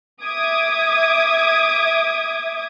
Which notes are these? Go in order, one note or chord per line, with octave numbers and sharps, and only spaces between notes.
E5 D6 D#6 G#6